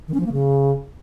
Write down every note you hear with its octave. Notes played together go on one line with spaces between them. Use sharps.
D#3
C#4
F3
A#3
C#3